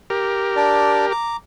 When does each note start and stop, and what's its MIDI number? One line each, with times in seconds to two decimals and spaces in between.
0.10 1.13 67
0.10 1.13 70
0.56 1.06 62
0.56 1.06 74
1.11 1.37 82
1.11 1.37 86